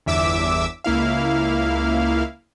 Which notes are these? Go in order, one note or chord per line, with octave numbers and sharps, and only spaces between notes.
G1 E2 E5 D6 E6
C#2 A#3 E4 F5